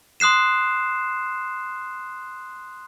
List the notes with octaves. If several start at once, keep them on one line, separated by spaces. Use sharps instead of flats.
C6 D#6 F#6 C7 E7